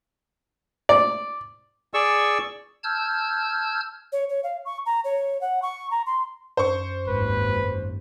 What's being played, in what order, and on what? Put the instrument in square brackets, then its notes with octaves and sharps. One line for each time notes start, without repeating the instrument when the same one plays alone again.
[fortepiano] D5
[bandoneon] G#4 D5 C#6 E6
[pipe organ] A5 E6 F6 G6 G#6
[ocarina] C#5
C#5
F5
C#6
A#5
C#5
F#5
C#6
A#5
C6
[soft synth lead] F#2 [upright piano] C5 C#6
[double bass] G#1 D#2 [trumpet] B4